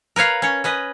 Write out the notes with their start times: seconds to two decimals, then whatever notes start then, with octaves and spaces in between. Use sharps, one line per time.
0.16 A#4 B4 C#5 F5
0.42 C#4 C#5
0.64 C#4 B4 D#5